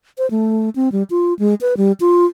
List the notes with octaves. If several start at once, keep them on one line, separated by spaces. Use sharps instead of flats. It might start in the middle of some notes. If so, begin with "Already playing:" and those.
C5
A3
C4
G3
F4
G#3
B4
G3
F4